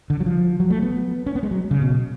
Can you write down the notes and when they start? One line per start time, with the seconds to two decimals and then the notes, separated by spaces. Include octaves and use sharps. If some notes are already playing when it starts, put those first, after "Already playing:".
0.10 D3
0.20 F#3
0.26 F3
0.60 F#3
0.70 A3
0.82 B3
1.27 C#4
1.35 B3
1.43 G#3
1.51 F#3
1.71 C#3
1.82 B2